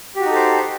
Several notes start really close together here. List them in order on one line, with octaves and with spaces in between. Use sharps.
G4 F#4 D#4 A4 C5